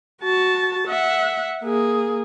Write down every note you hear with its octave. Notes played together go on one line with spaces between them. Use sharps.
F#4 A5
E5 F#5
A#3 G#4